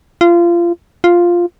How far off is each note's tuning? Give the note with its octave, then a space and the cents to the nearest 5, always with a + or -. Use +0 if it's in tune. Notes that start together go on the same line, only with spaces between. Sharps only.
F4 -25
F4 +0